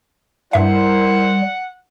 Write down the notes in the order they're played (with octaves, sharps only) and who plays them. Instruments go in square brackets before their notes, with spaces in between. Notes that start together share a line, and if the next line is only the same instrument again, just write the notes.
[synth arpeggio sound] G2 E5 [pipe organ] G3 [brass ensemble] E4 A#4 C5 [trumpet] F#5